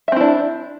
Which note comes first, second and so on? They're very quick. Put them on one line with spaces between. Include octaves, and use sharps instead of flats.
E5 C4 E4 D4